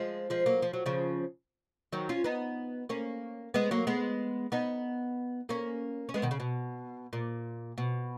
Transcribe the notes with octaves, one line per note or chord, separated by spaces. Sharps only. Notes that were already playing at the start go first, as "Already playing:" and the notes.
Already playing: F3 G#3
F3 G#3
F#3 A#3
F3
F#3
C#3 F3
D#3 F#3
C#4 F4
B3 D#4
A#3 C#4
G#3 B3
F#3 A#3
G#3 B3
B3 D#4
A#3 C#4
C#4
G#3 B3
B2 D#3
C#3
B2
A#2
B2